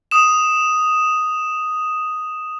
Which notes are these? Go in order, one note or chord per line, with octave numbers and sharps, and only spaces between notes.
D#6 E7